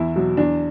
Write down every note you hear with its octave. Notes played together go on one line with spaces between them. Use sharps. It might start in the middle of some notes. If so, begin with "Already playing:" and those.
Already playing: E2 E4
B2 F#3
E2 D4